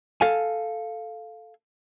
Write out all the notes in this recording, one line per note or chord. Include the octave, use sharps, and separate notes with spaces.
A4 F5 G#5